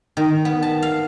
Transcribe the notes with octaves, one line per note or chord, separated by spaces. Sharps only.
D#3
B3
A5
F5